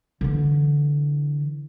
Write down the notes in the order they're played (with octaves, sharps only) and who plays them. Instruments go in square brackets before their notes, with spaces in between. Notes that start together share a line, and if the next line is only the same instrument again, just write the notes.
[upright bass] D3 E3